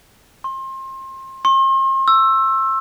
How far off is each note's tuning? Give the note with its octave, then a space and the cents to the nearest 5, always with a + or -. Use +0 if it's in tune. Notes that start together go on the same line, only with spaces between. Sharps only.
C6 +30
C6 +40
E6 +10